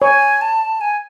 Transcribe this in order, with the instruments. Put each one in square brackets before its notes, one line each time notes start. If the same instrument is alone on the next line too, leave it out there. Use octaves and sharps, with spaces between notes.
[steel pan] C#5 [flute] G#5
[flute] A5
G#5